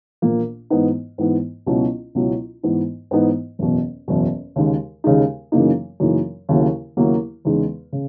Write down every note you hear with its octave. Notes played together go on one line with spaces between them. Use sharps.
A#1 A#2 A#3
G#2 E3 B3 D#4
G#2 E3 B3 D#4
C#2 B2 F#3 C#4 E4
C#2 B2 F#3 C#4 E4
G#2 E3 B3 D#4
G#2 E3 B3 D#4
F#1 E2 B2
F#1 E2 B2
D#2 C#3 G#3 D#4
D#2 C#3 G#3 D#4
F#2 C#3 E3 A#3 D#4
F#2 C#3 E3 A#3 D#4
D#2 C#3 F#3 A#3 E4
D#2 C#3 F#3 A#3 E4
E2 C#3 G#3 D#4
C#3